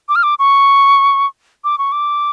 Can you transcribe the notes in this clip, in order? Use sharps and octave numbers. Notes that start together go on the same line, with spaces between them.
D6
F6
D6
C#6
D6
C#6
D6